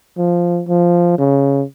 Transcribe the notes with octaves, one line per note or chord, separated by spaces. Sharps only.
F3
F3
C#3